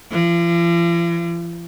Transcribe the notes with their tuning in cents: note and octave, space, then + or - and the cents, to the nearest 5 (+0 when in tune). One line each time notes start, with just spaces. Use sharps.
F3 -45